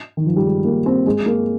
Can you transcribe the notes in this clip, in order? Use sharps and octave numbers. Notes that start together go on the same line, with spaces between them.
D#3
F3
G3
G#3
A#3
C4
G#3
A#3